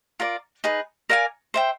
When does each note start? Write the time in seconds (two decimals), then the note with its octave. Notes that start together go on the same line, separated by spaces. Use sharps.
0.20 F4 A#4 D5
0.64 D#4 G#4 B4
1.09 A#4 D5 F5 G#5
1.54 C5 E5 G5